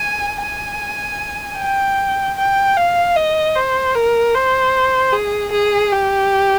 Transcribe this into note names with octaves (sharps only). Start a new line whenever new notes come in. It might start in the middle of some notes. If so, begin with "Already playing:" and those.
Already playing: G#5
G#5
G5
G5
F5
D#5
C5
A#4
C5
G#4
G#4
G4